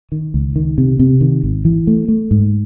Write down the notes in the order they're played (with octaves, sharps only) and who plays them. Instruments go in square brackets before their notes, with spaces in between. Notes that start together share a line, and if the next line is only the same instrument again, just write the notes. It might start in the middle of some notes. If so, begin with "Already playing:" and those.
[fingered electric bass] D#3
C#2
D#3
C3
C3
D#3
G#1
E3
A3
A3
G#2